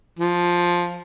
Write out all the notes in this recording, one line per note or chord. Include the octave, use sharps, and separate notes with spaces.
F3